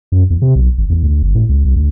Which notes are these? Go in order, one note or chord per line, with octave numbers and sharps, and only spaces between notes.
F#2
E2
C3
B1
G#1
E2
D2
G1
A2
C#2
C2
D2